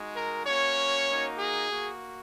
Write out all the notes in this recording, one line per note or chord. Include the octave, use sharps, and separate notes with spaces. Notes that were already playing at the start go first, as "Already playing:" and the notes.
Already playing: G#3 D#4 F#4
A#4
A#3 C#4 F#4 C#5
A#3 D#4 F#4
G#4
A#3 F#4